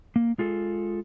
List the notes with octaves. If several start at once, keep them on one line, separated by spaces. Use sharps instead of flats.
A#3
G#3 F4 G#4 A4